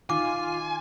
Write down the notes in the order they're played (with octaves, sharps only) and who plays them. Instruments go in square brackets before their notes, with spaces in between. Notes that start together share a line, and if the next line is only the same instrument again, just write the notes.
[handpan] D#3 D#4 [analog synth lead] F4 [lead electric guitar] G#5 [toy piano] D6